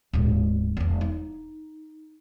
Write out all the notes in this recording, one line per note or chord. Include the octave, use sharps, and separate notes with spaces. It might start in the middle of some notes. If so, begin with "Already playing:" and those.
D1 G#2
E1 B3
D#4